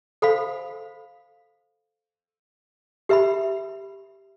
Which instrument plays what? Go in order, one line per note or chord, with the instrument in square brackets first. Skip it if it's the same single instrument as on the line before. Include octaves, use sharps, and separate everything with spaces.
[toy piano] A4 C5 F5 B5
G4 B4 E5 B5